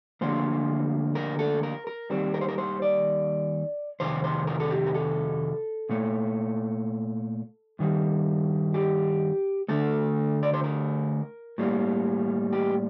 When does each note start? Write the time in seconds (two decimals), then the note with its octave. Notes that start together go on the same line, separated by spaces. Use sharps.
0.21 D2 D3 F3 A#3 C5
1.15 A#4
1.39 A4
1.63 A#4
1.87 A#4
2.10 D#2 D#3 G3 C4
2.34 A#4
2.41 C5
2.48 A#4
2.58 C5
2.82 D5
4.00 F2 C3 D#3 C5
4.24 C5
4.47 A#4
4.60 A4
4.71 G4
4.87 A#4
4.94 A4
5.89 A#2 A3
7.79 G2 D#3 G3
8.74 G4
9.68 D2 D3 A3 A4
10.43 D5
10.54 C5
10.64 A#4
11.58 A2 G3 A#3
12.53 G4